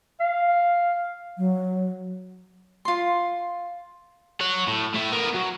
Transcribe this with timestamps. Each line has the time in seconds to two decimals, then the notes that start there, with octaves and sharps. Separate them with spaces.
0.20 F5
1.38 F#3
2.85 F4 C6
4.41 C#5 F#5
4.68 A2
4.95 A3 E4
5.12 B3 A#4
5.34 F#3